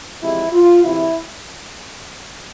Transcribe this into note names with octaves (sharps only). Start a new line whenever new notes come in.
E2 C3 F3 G#3 E4
F4
E2 C3 E3 E4